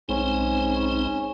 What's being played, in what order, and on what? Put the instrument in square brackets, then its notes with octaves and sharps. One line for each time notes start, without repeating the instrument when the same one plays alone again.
[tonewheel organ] B1 C4 D#4 [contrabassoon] G#2 [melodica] C#4